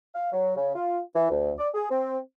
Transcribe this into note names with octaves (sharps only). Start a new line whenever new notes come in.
F5
F#3
C#3
F4
E3
D2
D5
G#4
C4